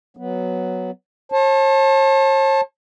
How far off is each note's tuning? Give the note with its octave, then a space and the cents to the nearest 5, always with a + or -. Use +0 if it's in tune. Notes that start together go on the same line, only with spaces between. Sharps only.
F#3 +0 B3 +0
C#5 -45 A5 +0